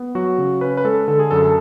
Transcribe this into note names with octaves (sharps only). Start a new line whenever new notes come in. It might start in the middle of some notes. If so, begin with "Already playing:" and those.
Already playing: B3
F#3 F#4
C#3
C#4 B4
B4
G#3 A4
D3 A4
G#4
F#2 A4
A4